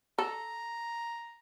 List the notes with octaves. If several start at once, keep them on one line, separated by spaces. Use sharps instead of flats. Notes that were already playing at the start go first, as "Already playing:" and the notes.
A4 A#5